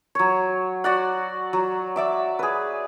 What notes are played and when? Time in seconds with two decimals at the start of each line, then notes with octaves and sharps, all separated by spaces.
0.15 F#3 C#5
0.84 F#4 D5 F#5
1.53 F#3
1.96 D5 E5 D6
2.39 G#4 B4